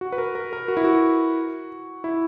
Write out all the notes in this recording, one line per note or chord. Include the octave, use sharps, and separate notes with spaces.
F#4
B4
A#4
A#4
A#4
F#4
E4
F#4
E4